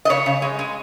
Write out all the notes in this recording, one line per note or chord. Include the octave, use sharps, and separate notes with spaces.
D#5
C#3 C#5
C#3
G#3
G#3